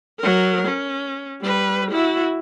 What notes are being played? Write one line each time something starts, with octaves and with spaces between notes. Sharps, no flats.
F#3 A#4
C#4
G3 B4
E4 F#4